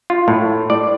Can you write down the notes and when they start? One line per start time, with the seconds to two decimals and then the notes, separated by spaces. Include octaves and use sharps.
0.10 F4
0.28 A2
0.70 D5